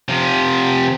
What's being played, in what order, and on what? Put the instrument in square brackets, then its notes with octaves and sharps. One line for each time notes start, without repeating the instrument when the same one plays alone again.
[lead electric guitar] C3 F3